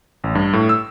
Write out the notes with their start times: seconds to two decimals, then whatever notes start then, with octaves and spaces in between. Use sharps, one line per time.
0.24 A1
0.35 G2
0.53 A2
0.69 E6